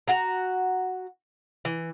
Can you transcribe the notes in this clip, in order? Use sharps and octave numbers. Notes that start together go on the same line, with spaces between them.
F#4 F#5 A#5
E3